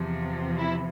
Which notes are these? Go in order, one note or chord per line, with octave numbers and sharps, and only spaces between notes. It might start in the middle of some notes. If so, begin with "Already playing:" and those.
Already playing: E2 C3 F3
E4